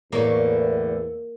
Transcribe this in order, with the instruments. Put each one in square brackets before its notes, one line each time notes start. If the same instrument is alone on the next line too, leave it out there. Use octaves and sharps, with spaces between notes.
[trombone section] E2 [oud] A2 D3 C#5 [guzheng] A#3